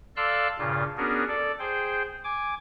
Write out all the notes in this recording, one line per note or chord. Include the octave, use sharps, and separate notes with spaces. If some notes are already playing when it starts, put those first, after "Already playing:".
A4 D5 F5 C6 E6 F#6
G2 A#2 C#3 F4
B3 C#4 D4 F#4 G#4 A#4
A4 D5
G#4 C5 G5
G#5 D6